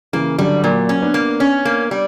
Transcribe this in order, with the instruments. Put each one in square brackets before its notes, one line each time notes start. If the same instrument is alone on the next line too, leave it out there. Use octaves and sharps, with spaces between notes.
[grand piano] C#3 E3 [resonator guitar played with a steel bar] A#3
[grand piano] D3 F#3 [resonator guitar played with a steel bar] G3
[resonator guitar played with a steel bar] A#2 [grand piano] F#3 A#3
[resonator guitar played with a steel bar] C#4
[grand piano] B3 D4
[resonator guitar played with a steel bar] A#3
C#4
A#3
G3